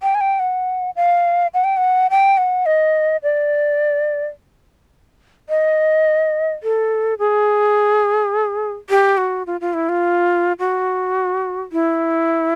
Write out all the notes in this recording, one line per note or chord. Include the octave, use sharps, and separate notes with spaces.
G5
G#5
G5
F#5
F5
F#5
G5
F#5
G5
F#5
D#5
D5
D#5
A4
G#4
G4
F#4
F4
F4
E4
F4
F#4
E4